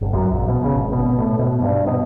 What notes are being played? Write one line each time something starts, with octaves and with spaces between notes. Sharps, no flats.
G1
F#2
A#1
B2
C#3
G#1
B2
B2
A2
B2
G2
B2